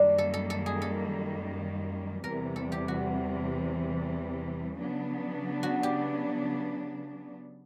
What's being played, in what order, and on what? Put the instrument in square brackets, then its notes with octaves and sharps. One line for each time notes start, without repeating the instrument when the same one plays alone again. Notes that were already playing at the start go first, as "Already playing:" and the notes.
Already playing: [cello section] F#2 D#3 G3 A#3 [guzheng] D4
[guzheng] A4
A4
A4
G#4
A4
[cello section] E2 C3 E3 G3 [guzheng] A#4
[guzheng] A4
G4
F#4
[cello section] C#3 F#3 B3 D4
[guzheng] F#4
G4